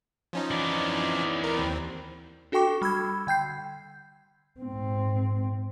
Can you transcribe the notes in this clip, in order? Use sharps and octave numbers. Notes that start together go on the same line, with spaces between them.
F3 C#4 D#4
E3 D5
A#4
D#2 C4
D4 F#4 A4 G5 C#6 D6
G3 B5 E6 G#6
D3 G5 G6 C7
G#2 C4